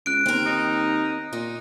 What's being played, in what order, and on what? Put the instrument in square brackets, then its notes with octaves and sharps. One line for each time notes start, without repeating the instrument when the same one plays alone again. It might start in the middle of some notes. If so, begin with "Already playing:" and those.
[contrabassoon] C#2 [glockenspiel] F#6 D7
[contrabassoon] D#2 [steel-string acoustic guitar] C4 A#4
[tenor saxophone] D#4
[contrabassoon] A#2 [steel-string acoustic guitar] D#4